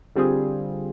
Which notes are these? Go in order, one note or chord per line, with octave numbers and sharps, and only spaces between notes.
D3 G3 C4 F4 G#4